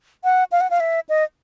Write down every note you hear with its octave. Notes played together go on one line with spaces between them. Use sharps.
F#5
F5
F#5
F5
E5
D#5